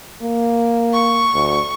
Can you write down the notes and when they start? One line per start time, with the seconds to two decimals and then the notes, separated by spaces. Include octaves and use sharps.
0.23 A#3
0.92 C#6
1.34 D2